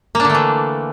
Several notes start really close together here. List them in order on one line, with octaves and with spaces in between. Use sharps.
A#3 D4 D3 A3 E3